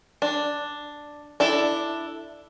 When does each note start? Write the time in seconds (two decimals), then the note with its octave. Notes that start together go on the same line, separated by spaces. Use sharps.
0.22 D4
1.40 D4 E4 A4